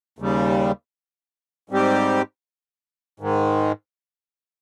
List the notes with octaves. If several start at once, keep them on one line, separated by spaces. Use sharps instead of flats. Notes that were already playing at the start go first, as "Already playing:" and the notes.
D#2 C#3 G3
G#2 G3 C4 G4
G#2 D#3 G#3